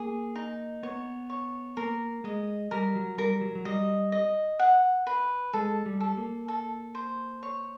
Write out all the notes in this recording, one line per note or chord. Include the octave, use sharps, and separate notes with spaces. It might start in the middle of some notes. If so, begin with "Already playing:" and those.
Already playing: A#3 G#4
D#4
B3 C#5
C#5
A#3 A#4
G#3 D#5
G3 A#4
F#3
G3 A#4
F#3
F#3
G3 D#5
D#5
F#5
B4
G#3 A4
G3
A4
A#3
A4
C5
C#5